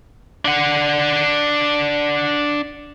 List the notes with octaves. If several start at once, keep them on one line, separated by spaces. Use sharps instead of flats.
D4 F#5